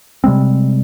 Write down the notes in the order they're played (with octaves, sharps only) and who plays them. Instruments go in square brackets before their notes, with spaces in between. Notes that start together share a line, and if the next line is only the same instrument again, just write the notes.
[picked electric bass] C3 G3 G#3 C4